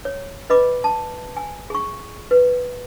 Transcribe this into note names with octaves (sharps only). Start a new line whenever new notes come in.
C#5
B4 D#5 B5 D6
A5
G#5
G#4 C#6
B4